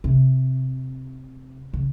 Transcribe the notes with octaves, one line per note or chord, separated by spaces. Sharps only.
C3
C#3